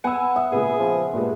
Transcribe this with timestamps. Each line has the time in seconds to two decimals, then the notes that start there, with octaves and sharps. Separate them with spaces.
0.04 B3 F#5 G#5 E6
0.36 E5 D#6
0.52 A#2 C#3 G#3 B3 G#4
0.80 F3
1.14 G2 A#2 G#3